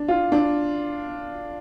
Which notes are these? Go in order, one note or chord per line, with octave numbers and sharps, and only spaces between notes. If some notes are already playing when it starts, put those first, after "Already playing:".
Already playing: D4
F4
D4